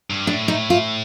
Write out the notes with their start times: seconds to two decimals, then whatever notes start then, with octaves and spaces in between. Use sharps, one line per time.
0.10 G2
0.26 A2 D4
0.48 D#4
0.70 F4